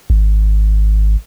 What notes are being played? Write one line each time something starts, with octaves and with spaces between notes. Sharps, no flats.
G#1